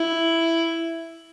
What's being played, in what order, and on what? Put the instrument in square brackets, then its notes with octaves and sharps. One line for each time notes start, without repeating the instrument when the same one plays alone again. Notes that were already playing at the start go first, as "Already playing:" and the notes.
Already playing: [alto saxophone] E4